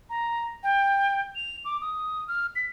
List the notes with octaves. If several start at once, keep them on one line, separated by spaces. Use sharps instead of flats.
A#5
G5
F7
D6
D#6
F6
B6